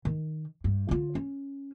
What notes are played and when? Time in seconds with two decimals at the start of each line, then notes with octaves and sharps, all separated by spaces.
0.05 D#3
0.64 G2
0.89 D3 F4
1.15 C#4